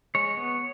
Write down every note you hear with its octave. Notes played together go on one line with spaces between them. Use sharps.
G#3 C#5
B3